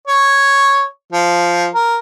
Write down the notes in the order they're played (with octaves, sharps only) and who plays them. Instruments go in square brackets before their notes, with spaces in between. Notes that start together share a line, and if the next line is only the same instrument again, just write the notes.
[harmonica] C#5
F3
A#4